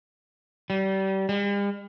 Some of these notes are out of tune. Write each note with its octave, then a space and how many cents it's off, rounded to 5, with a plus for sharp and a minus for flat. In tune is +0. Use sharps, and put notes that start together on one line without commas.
G3 -30
G3 +45